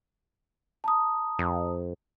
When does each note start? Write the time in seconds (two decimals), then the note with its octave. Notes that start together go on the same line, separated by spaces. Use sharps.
0.84 A5 A#5 D#6
1.39 F2